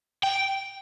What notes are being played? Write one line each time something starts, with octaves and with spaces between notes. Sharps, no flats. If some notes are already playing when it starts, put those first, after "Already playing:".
G5